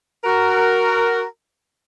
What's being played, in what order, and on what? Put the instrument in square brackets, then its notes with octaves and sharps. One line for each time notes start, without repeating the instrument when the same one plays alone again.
[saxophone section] F#4 A#4